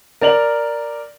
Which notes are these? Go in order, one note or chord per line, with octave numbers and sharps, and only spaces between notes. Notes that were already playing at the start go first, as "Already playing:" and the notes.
A#4 D5 F7 F#7